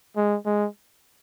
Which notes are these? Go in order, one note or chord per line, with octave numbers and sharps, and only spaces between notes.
G#3
G#3